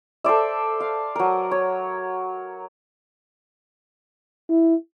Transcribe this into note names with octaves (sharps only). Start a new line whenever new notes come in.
A4 C5 D5 E5
F5
F#3 A#4
C#5
E4